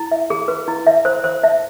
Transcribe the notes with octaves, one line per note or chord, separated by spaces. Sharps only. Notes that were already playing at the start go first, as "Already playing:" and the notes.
Already playing: E4
E5
G#4
B4
E4
E5
C5
C5
E5